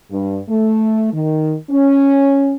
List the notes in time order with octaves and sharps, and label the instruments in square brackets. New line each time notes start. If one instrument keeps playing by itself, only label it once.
[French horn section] G2
A3
D#3
C#4